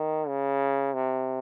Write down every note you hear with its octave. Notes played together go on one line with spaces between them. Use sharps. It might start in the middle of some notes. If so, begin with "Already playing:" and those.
Already playing: D#3
C#3
C3